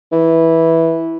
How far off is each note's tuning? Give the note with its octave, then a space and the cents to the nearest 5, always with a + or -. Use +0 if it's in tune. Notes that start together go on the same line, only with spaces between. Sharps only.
E3 -10